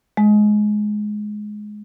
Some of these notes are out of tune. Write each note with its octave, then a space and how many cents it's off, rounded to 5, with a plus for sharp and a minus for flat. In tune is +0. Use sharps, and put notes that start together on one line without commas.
G#3 +15